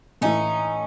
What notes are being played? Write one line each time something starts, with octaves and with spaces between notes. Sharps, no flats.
A2 E3 A3 C#4 D#4